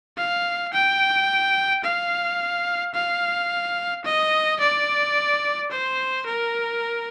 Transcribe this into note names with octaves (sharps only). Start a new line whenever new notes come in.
F5
G5
F5
F5
D#5
D5
C5
A#4